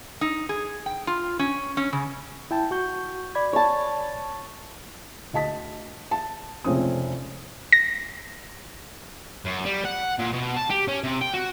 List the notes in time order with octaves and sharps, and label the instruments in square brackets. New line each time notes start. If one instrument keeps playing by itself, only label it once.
[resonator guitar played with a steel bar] D#4
G#4
G5
F4
C#4
C#4
C#3
[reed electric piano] E4 G5 A5
F#4 C#6 G6
D5 B5 G#6
[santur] C#5 A5
[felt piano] D2 D#5 A5 B6
A5
F1 C#2 A3 C4 C#4 D#6
[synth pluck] A#6
[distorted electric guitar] F#2
G3
F#5
A#2
B2
A5
G4
C#4
C3
G5
F#4